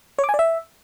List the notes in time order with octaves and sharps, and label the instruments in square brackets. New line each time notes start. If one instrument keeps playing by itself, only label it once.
[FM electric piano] C#5
D6
G#5
D5
E5